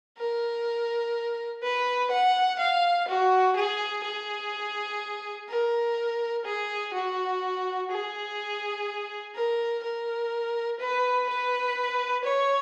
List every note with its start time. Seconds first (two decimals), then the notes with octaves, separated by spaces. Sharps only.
0.18 A#4
1.63 B4
2.11 F#5
2.59 F5
3.08 F#4
3.56 G#4
4.04 G#4
5.49 A#4
6.45 G#4
6.93 F#4
7.91 G#4
9.35 A#4
9.83 A#4
10.80 B4
11.29 B4
12.24 C#5